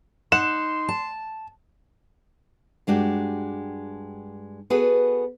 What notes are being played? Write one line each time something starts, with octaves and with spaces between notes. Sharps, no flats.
D#4 F#5 C6 E7
A5
G2 G#3 D4 F#4 G4
B3 F#4 G#4 A4 B4